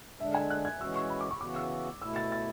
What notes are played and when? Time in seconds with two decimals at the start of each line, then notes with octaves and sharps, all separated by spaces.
0.20 D3 G#3 D4 E5
0.34 G#5
0.50 F#6
0.65 G#6
0.80 E3 G#3 C#4 F#4 E6
0.96 C#6
1.10 B5
1.21 D6
1.31 C#6
1.41 C#3 E3 B3 F#4 D6
1.56 E6
2.01 B2 A3 E4 E6
2.16 A6
2.32 A6